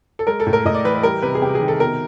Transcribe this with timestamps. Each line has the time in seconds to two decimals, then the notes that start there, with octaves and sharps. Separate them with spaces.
0.19 A4
0.27 G#3 A#4
0.40 A4
0.47 A2
0.53 A#4
0.65 A2 D#5
0.74 D5
0.84 E3 B4
0.95 B4
1.03 G3 A#4
1.22 C3 B4
1.35 G#4
1.42 C3 G4
1.55 G#4
1.61 D#3
1.68 A4
1.80 B2 A#4